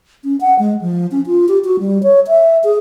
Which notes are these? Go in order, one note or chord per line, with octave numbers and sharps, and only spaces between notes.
C#4
F#5
G#3
F3
C#4
F4
G4
F#4
G3
C#5
E5
G#4